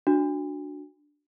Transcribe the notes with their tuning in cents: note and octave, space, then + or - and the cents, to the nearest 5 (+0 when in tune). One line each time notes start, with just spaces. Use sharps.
D4 +0 F#4 -15